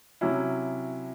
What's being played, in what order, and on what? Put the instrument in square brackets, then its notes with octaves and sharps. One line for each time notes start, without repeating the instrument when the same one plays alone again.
[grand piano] C3 F#3 C#4 E4